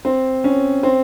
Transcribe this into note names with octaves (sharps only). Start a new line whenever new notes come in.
C4
C#4
C4